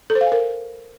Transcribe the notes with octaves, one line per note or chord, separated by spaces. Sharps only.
A4
C5
F5
G#5
A#4